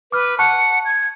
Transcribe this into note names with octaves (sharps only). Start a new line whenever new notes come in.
B4 D6 F6
F#5 A5 C#6 F#6
G#6